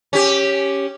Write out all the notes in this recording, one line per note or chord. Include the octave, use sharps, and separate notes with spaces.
C#4 G4